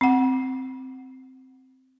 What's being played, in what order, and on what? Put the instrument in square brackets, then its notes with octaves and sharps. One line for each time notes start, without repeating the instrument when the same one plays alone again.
[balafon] C4 F#5